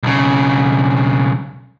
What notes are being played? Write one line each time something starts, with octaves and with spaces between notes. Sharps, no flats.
B1 C#3